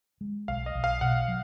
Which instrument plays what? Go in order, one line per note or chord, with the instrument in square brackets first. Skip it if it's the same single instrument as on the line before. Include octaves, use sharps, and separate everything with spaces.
[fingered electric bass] G#3
[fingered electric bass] B1 [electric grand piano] F5
[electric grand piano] D#5
[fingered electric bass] B1
[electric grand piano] F5
[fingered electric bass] B2 [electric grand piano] F#5
[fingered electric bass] F#3